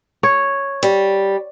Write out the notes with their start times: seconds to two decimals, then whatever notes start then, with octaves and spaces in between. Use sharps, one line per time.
0.23 C#5
0.83 G3